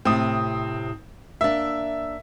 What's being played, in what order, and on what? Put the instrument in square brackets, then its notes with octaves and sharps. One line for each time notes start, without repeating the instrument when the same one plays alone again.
[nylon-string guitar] A2 C3 [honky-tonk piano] C4 D#6
[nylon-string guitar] A#3 D4 [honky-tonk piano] E5